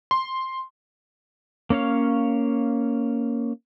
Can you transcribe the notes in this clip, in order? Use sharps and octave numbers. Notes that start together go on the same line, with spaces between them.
C6
A#3 C#4 C#5 F5